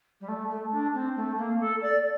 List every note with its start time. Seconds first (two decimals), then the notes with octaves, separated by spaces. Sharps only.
0.21 G3
0.28 A3
0.50 A3
0.72 D4
0.94 C4
1.16 A3
1.38 A#3
1.60 A4
1.81 D5